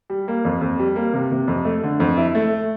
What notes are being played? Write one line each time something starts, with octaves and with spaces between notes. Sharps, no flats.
G3
A#3
F2
F2
G3
A#3
C3
C3
F2
A3
D3
F2
E4
A3